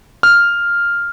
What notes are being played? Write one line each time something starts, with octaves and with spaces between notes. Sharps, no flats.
F6